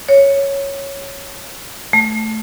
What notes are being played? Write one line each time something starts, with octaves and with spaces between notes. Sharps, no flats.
C#5
A3